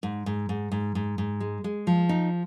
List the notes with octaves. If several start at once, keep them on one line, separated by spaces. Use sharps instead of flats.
G#2
G#2
G#2
G#2
G#2
G#2
G#3
G#3
F3
D#4